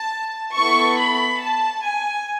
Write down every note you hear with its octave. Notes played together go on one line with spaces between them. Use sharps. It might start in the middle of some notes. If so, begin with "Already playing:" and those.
Already playing: A5
B3 E4 A4 C#6
B5
A5
G#5